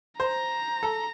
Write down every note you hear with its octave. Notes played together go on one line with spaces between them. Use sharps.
C5 A#5
A4